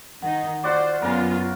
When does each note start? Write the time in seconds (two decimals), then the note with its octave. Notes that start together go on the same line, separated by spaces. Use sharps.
0.22 D#3 D#4 F#5
0.64 F4 F#4 C5 D5
1.02 F#2 C#3 B3 F4 A#4